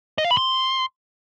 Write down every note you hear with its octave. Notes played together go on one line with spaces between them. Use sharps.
D#5
F5
B5
C6